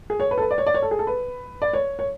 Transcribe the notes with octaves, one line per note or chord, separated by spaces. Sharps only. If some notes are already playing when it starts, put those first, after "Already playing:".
G#4
C#5
B4
A4
B4
D5
C#5
D5
C#5
A4
G#4
A4
B4
D5
C#5
C#5